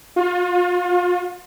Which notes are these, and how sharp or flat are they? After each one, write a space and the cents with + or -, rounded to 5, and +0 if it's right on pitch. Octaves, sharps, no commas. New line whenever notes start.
F4 +35